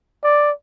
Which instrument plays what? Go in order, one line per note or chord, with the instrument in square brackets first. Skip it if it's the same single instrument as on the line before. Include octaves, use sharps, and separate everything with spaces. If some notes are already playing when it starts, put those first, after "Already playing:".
[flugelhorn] D5